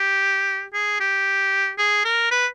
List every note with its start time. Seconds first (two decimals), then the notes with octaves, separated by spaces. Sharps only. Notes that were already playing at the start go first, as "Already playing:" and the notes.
Already playing: G4
0.73 G#4
1.00 G4
1.78 G#4
2.05 A#4
2.31 B4